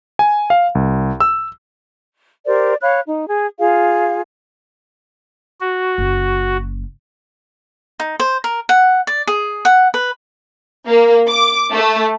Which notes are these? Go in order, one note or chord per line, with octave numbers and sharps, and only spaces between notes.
G#5
F5
C2
E6
G4 A#4 C5 D5
C#5 F5 B5 F#6
D#4
G#4
F4 G#4 F5
F#4
F#1
D#4
C5
A#4
F#5
D5
G#4
F#5
B4
A#3
D6
A3